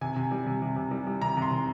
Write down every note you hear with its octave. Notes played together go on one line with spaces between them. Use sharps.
C3 G#5
C3
G3
C3
C3
C3
G3
G3
C3 A#5
C3
C6
C3